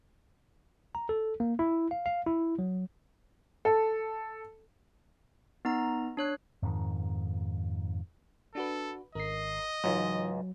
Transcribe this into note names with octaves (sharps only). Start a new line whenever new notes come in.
A#5
A4
A#3
E4
F5
F5
E4
F#3
A4
B3 D#4 A#5
D4 C#5 F#6
F2 G#2 D#3
D4 F#4 A4 B4
G#1 A#4 D#5 C7
C#2 G#2 E3 F#3 D#4 F4